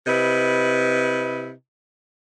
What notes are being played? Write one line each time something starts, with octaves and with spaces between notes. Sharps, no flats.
C3 E4 B4 D#5